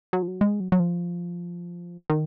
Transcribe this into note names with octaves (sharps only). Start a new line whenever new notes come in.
F#3
F3
F#3
G#3
F#3
F#3
F3
D#3